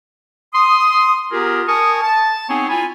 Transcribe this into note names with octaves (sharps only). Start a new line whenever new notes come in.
C6 D#6
B3 F4 G4 G#4 A#4
A#4 G#5 A5 C#6 D#6
A5
B3 C4 D#4 G#4 C#5 G#5
E4 F4 G#5